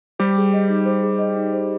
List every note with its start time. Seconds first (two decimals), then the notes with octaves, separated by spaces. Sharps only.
0.19 G3 G4 C5
0.37 G#4
0.53 D#5
0.69 D#4
0.85 C5
1.02 G#4
1.19 D#5
1.36 D#4
1.53 C5